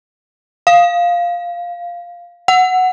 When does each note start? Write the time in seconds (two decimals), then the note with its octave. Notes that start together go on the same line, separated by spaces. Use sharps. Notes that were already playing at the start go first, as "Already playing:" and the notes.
0.67 F5
2.48 F#5